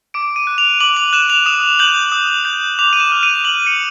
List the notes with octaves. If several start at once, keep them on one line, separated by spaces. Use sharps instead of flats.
D6 D7
D#7
F#6
F7
D6 F#7
F7
F#6 E7
F7
D#6 E7
G6 F#7
D#6
G6
D6 F7
D#7
E7
F6
D#7
D6 F#7
C#7